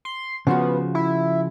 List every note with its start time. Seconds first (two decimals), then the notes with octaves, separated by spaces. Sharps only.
0.05 C6
0.47 C#3 F3 B3 F#4
0.95 E4